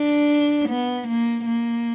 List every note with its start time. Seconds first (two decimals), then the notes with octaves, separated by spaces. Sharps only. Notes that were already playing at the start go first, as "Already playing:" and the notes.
Already playing: D4
0.69 B3
1.08 A#3
1.45 A#3